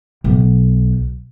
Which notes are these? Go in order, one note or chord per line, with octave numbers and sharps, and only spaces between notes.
B1